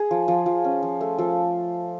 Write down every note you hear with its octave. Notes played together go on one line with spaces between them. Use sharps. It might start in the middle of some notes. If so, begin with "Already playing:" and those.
Already playing: G#4
F3
F3
F3
C#4
F3
A3
F3 A4